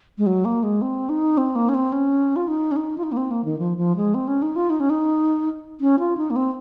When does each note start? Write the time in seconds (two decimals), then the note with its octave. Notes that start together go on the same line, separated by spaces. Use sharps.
0.18 G#3
0.26 F#3
0.45 A#3
0.63 G#3
0.82 C4
1.09 D#4
1.37 C4
1.55 A#3
1.69 C#4
1.74 C4
1.92 C#4
2.36 F4
2.48 D#4
2.71 C#4
2.76 D#4
2.98 F4
3.03 D#4
3.12 A#3
3.17 C4
3.31 A#3
3.45 D#3
3.59 F3
3.77 F3
3.96 G#3
4.14 C4
4.28 C#4
4.42 D#4
4.56 F4
4.70 D#4
4.80 C#4
4.90 D#4
5.80 C#4
5.99 F4
6.17 D#4
6.30 A#3
6.36 C4